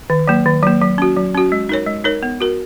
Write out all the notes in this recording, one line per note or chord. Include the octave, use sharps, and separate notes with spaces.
D#3
F#3 A#3
D#3
F#3 A#3
F#3
C#4 F#4
F#3
C#4 F#4
G#3
D#4 A#4 C#5
G#3
D#4 A#4 C#5
B3
F#4 A#4